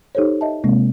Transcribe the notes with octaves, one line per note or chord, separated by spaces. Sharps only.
D#4 G4 A4 C5 C#5
D#5 E5 A5
C3 G#3 A#3 C4